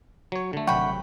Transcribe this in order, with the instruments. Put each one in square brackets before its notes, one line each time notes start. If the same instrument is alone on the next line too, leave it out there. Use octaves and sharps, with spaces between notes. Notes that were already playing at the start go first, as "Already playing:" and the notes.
[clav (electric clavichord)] F#3 C#5
D3 A3
[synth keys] G#1 C3 F#3 [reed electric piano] F#5 C#6 [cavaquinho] G5 B5